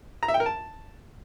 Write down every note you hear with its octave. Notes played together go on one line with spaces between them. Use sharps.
A#5
E5
G5
A#4
A5